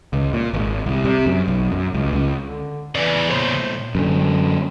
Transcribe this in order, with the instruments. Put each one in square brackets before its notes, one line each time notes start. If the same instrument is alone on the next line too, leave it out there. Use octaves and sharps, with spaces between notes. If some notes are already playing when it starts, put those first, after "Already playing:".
[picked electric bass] C#2
A#2
G#1
C2
C3
F#2
B1
F#2
C#2
C#2
[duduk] D3
[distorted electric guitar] E2 C#3 [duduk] E3 [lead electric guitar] D5
[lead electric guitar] A#2 C#5 [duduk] C5
[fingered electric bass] F#2 D3